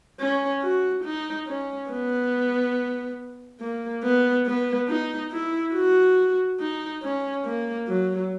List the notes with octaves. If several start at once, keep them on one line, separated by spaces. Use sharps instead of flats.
C#4
F#4
D#4
C#4
B3
A#3
B3
B3
D#4
E4
F#4
D#4
C#4
A#3
F#3